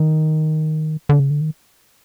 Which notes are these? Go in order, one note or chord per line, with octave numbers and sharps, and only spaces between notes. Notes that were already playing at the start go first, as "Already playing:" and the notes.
Already playing: D#3
D3
C#3
D3
D#3